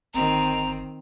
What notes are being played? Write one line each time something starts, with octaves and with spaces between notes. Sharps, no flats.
G1 D#3 C4 A#5